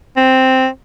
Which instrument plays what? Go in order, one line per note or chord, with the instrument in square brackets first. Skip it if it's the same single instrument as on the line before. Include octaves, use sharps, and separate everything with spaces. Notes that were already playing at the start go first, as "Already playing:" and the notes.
[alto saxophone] C4